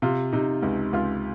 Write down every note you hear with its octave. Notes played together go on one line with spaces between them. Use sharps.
C3 F4
C3 D#4
C#2 D#4
C#2 F4